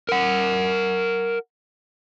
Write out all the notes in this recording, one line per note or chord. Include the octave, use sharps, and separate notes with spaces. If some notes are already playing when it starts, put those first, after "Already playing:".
A#4 F#5